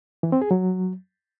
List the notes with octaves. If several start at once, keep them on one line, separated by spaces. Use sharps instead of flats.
E3
C4
G#4
F#3